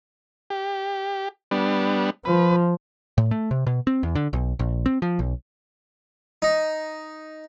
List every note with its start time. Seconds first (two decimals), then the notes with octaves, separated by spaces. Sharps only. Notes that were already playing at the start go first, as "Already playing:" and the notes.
0.50 G4
1.51 G3 B3 D4
2.25 F3 B4
3.18 A2
3.31 A3
3.51 C3
3.67 B2
3.87 C4
4.03 E2
4.15 D3
4.33 B1
4.59 A#1
4.86 C4
5.02 F3
5.19 B1
6.42 D#4